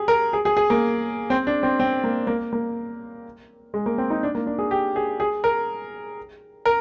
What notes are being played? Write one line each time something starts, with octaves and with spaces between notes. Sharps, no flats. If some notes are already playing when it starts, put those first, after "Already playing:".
Already playing: G4 G#4
A#4
G#4
G#4
G#4
A#3
C4
D4
C4
C4
A#3
A#3
A#3
G#3
A#3
C4
D#4
D4
A#3
D4
G#4
G4
G#4
G#4
A#4
A#4